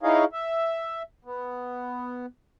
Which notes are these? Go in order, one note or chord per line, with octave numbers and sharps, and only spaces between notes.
D#4 E4 G#4 C#5 D#5 F5
E5
B3